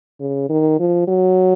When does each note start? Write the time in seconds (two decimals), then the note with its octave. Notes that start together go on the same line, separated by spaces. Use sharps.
0.20 C#3
0.49 D#3
0.80 F3
1.08 F#3